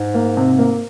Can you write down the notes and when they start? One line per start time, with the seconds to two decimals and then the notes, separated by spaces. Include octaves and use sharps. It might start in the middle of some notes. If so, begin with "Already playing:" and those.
Already playing: G#2
0.14 A#3
0.37 C3
0.58 A#3